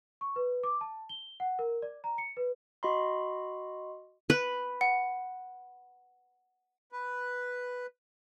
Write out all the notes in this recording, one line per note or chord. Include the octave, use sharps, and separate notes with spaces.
C#6
B4
D6
A5
G7
F#5
A#4
D5
A#5
C#7
B4
F#4 D#5 B5 C6
B4
F#5
B4